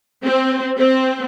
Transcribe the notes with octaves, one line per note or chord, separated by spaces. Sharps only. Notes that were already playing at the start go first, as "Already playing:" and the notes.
C4
C4